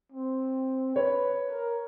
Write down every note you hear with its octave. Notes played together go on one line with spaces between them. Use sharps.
C4
B4 C#5
A#4